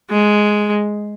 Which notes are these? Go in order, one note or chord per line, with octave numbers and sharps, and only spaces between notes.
G#3